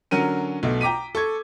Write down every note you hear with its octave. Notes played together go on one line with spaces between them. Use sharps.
D3 F#3 C#4 A#4 D#7
B1 B2 A3
G5 A#5 D6 B6 D#7
A4 C#6 G#6